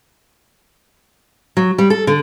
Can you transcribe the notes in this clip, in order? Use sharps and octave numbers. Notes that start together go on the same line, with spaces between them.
F#3
G3
A4
D3